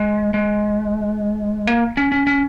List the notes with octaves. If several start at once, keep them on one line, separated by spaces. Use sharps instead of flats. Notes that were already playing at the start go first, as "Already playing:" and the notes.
Already playing: G#3
G#3
A#3
C#4
C#4
C#4